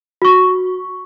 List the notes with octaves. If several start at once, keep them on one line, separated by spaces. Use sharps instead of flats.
F#4 C#6